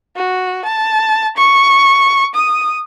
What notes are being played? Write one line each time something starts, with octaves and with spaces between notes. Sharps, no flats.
F#4
A5
C#6
D#6